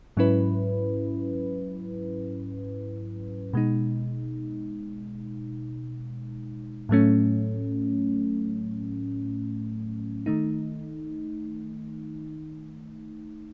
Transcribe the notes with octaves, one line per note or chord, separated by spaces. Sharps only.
G#2 F#3 C#4 E4 B4
B2 G#3 D#4
A2 F#3 A3 C#4
D#3 A3 D#4